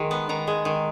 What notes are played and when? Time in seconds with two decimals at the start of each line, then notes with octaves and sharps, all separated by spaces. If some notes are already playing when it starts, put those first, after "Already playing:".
Already playing: D#3 G#3
0.11 B3
0.29 D#3 A#5
0.47 G#3
0.65 D#3